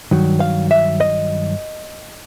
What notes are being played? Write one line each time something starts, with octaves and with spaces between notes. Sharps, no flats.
G2 D#3 F#3
F5
E5
D#5